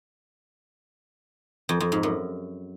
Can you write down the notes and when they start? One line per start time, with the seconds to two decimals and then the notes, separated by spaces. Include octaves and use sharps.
1.69 F2
1.80 F2
1.92 G#2
2.03 F#2